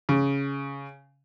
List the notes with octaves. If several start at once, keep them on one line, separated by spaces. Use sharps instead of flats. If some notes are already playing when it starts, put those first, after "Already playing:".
C#3